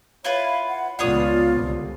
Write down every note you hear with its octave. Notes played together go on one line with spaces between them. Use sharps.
E4 F4 B4 C#5 F5 B5
F#5
C#2 B3 D4 F4 C#5 D5 D#6
C2 D3